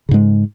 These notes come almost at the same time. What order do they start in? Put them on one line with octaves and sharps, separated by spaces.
C#3 G#2 G#3